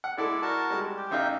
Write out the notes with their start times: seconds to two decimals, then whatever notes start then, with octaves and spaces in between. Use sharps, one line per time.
0.04 F#5
0.17 G#3 E4 A4 D5
0.42 F#4 A#4 A5
0.70 G3 G#3
0.97 G4
1.11 A1 D#4 E5 F5 G5